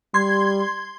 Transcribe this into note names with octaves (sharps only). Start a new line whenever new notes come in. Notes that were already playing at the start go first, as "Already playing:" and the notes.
G3 C6 G#6